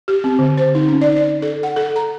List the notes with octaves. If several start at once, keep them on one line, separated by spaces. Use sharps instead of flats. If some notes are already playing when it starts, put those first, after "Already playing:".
G4
C4
D3
C5
D#4
C#4
D5
D5
A4
F#5
A4
A#5